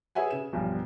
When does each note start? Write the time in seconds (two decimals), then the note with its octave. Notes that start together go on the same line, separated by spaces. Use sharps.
0.15 G#4 B4 C#5 E5 F#5 G#5
0.30 C#3 E7
0.53 B1 E2 G2 F3